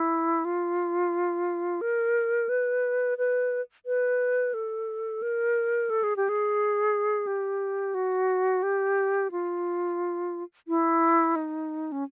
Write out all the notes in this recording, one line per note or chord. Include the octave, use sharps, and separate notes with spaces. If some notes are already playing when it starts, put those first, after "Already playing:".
Already playing: E4
F4
A#4
B4
B4
B4
A4
A#4
A4
G#4
G4
G#4
G4
F#4
G4
F4
E4
D#4
C#4